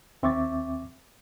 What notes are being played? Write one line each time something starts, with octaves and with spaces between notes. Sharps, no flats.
D#2 C4 E5 C#6 D6 A6